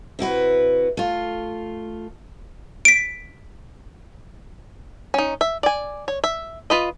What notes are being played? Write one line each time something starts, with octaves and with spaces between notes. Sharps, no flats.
C3 E4 F#4 B4
A3 F4
B6 D7
C#4 D#4
E5
D5 G#5
C#5
E5
F4 B4 D#5